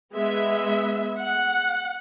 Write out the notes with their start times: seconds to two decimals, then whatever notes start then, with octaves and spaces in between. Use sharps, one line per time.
0.12 G#3 B3 E5
1.19 F#5